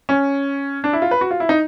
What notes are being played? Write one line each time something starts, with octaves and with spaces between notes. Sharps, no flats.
C#4
D4
E4
F4
B4
F#4
F4
E4
D#4